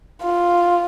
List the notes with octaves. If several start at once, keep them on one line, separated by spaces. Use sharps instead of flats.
F4